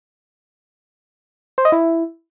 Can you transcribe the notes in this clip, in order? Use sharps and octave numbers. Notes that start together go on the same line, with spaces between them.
C5
D#5
E4